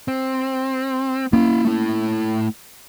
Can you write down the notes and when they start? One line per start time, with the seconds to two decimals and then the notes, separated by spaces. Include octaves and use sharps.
0.08 C4
1.33 A#3 C#4 E4 F5
1.65 A3 E4